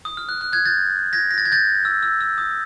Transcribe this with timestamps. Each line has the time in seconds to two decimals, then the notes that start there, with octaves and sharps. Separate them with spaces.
0.05 D#6
0.17 F6
0.29 F#6
0.41 F#6
0.53 F#6 G#6
0.66 G6 A6
1.13 G#6 A#6
1.31 A#6
1.38 A6
1.45 G#6
1.52 G6 A6
1.85 E6
2.03 E6
2.21 E6
2.38 D#6